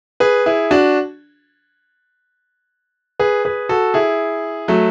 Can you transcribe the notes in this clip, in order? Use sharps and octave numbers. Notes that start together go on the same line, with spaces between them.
G#4 B4
E4 G#4
D4 F#4
G#4 B4
G#4 B4
F#4 A4
E4 G#4
F#3 A3